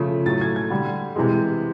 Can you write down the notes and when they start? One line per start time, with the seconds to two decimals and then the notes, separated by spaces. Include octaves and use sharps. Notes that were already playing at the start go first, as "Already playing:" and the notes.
Already playing: C#3 F3 A3
0.26 A2 F#3 A3 A6
0.41 G#6
0.56 G#6
0.70 D3 G3
1.16 C3 E3 G#3